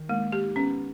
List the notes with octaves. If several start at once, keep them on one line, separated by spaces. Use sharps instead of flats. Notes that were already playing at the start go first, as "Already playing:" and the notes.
Already playing: D#3
G#3 A#3
G4
B3 C#4